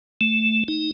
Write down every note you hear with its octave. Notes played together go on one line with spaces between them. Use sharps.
A3
D#4